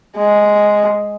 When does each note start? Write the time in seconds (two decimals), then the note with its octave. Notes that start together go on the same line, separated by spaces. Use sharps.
0.17 G#3